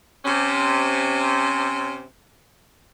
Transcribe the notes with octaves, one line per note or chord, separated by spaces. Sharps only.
C3 C#4